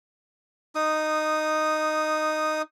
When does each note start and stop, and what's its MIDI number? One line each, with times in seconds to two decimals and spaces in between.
0.75 2.62 63
0.75 2.62 87